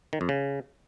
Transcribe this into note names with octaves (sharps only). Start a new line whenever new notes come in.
D#3
F2
C#3